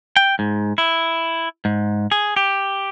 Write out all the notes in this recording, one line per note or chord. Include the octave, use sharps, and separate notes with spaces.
G5
G#2
E4
G#2
G#4
G4